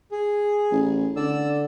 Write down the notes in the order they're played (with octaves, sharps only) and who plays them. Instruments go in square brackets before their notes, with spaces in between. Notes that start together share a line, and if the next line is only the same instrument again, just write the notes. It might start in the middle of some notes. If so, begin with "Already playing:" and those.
[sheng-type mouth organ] G#4
[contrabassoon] A1
[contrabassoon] D3 [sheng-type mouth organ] D5 E6